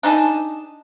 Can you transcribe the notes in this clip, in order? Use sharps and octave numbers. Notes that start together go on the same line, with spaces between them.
D4 D#4 G#4 A5